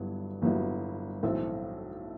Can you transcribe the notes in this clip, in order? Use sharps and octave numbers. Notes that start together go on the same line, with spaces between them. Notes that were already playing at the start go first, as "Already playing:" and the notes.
Already playing: G1 G2 F#3 B3 E4
G1 G2 F#3 B3 E4
B1 A2 E3 A3 C4 E5